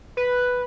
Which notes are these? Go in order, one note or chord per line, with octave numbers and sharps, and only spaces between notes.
B4